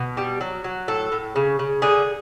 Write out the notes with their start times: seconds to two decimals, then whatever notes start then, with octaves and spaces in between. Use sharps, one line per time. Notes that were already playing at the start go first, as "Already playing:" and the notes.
Already playing: B2
0.17 G3
0.41 F#3
0.64 F#3
0.88 A2 A4
1.12 A2
1.36 C#3
1.59 C#3
1.82 D3 G#4